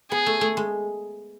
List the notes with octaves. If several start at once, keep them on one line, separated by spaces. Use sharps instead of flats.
B3 G#4
A3
A3
G#3